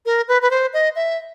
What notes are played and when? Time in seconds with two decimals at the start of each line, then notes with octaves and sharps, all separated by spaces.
0.06 A#4
0.28 B4
0.42 B4
0.51 C5
0.74 D#5
0.96 E5